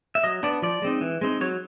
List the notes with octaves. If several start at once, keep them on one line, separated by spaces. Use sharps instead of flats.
E5
F#3 D#5
B3 D4 D5
F3 D5
G#3 C4 D#4
E3
G#3 C4 D#4
F#3 C#5